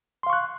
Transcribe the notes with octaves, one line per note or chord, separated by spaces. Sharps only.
F5 C6 C#6 F#6